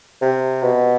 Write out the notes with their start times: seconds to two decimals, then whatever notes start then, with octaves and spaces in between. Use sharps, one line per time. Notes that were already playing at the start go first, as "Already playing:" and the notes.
0.22 C3
0.63 B2